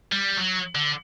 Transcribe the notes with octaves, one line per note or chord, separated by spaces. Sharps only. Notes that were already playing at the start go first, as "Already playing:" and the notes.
G3
F#3
D3